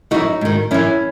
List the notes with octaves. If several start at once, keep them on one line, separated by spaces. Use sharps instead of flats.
F#2 E3 D#4 F#4
G#2 D#3
F#2 E3 C#4 E4